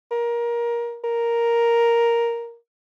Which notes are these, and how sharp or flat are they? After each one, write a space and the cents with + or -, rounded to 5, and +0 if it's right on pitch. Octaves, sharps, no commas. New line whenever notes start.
A#4 +20
A#4 +5